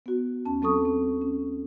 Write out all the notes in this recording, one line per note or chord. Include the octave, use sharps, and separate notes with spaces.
B3 F#4
D#2 C#4 A5
F#3 C4 A4 C#6 D#6
C4
C#4